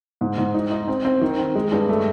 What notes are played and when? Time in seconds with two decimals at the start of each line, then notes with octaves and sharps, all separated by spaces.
0.21 G#2
0.38 G#2
0.54 D#4
0.72 D#4
0.88 C4
1.05 C4
1.21 D#3
1.38 C4
1.55 G#3
1.72 G2
1.89 A3